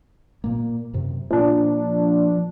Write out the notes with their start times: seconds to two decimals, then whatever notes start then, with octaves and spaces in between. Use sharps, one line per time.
0.44 A#2 A#3
0.94 F#2 C3
1.31 A#2 F3 A#3 D4